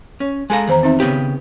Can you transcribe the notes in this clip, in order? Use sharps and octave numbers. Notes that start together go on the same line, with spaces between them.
C#4
G#3 A4 F5 G#5 A#5
E2 D#3 C5 A#5
C4 D#4 E5
C#3 B3 G4